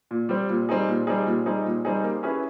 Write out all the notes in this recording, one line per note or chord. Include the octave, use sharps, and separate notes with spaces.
A#2
G3 C4
A#2
G3 C4 D#4 G#4
A#2
G3 C4 D#4 G#4
A#2
G3 C4 D#4 G#4
A#2
G3 C4 D#4 G#4
A#3
C#4 E4 G#4 B4